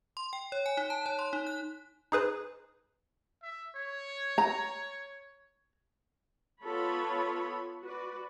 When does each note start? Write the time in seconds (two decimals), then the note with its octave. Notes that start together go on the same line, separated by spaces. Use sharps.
0.17 C6
0.33 G5
0.52 C#5
0.66 G#5
0.77 D#4
0.90 A5
1.06 C#5
1.19 C6
1.33 D#4
1.47 F#6
2.12 D#4 G#4 B4 C5
3.43 E5
3.76 C#5
4.38 A#5
6.62 B3 F4 A4 C#5 B5
7.82 F#4 B4 D5